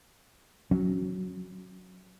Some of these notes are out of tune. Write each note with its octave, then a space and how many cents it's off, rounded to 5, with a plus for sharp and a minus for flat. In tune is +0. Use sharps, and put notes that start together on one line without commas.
F#3 -5 C#4 +0